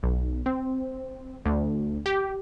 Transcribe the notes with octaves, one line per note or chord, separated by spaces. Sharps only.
B1
C4
D2
G4